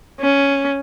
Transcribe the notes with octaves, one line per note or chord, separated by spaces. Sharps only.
C#4